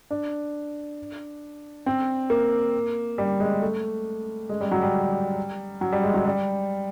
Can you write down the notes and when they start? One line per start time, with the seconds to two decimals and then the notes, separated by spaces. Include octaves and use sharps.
0.11 D4
1.86 C4
2.30 A#3
3.18 G3
3.40 G#3
3.62 A3
4.49 G#3
4.61 G3
4.71 F#3
4.82 G3
5.81 F#3
5.92 G3
6.03 G#3
6.14 F#3
6.25 G3